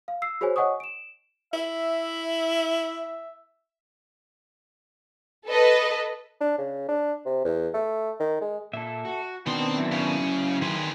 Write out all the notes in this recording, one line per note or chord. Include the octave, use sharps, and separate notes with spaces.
F5
E6 C7
F#4 G#4 C5 C#5 G#5
C#5 D#5 F#5 G#5 C#6 D#6
D7 E7
E4 E5
A4 B4 D#5
D4
C#3
D4
C3
E2
A3
D#3
G#3
A#2 A4 E5
F#4
B2 D#3 B3 C4 D4 C6
F#3 E4
C#3
D#3 G#4 B4 C6